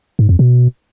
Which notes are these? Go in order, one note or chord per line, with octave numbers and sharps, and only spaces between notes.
G#2
F2
B2